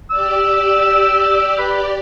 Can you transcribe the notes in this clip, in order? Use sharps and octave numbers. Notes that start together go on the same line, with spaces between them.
G4 D5 E6
B4